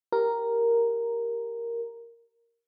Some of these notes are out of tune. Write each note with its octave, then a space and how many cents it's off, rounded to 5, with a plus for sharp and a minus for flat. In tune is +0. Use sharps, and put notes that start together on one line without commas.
G4 +0 A#4 +0